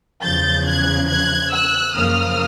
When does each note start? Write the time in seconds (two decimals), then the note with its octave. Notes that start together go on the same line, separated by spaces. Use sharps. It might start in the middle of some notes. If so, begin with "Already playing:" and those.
0.23 E2 C#3 F3 G6 A6
0.66 F#6 G#6
1.08 F#6 G#6
1.51 E6 F#6
1.95 F#2 C#3 F3 A#3 D#6 F6